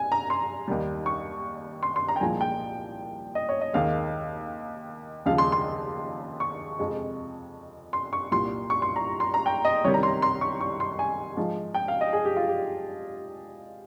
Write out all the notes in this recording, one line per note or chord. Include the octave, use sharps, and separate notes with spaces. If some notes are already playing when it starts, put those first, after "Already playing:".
Already playing: G#5
A#5
C6
D#2 D#3 G3
C#6
C6
C6
A#5
G5
C2 A#2 F3 G#3 G#5
G5
D#5
C#5
D#5
D#2 D#3 G#3 F5
D#2 C#3 F3 G#3 F5
C6
C6
C#6
F2 C3 F3 G#3
C6
C#6
C2 A#2 G3 C6
C#6
C6
A#5
C6
A#5
G5
D#5
C2 C3 D#3 G3 C#5
A#5
C6
C6
C#6
C#6
C6
G#5
G#2 F3 G#3
G5
F5
D#5
G#4
G4
F4
G4